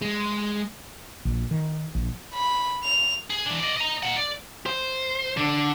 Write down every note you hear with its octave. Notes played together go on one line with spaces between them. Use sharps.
G#3
A#1
D#3
A#1
B5
F7
G#4
E3 D4
D5 D#5
D#5 A#5
D#4 F#5
D5
C5
D3